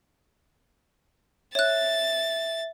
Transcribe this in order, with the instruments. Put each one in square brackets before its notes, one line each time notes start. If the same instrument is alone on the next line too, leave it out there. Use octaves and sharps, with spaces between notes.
[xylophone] C#5 F#6 [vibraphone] E5 [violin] A6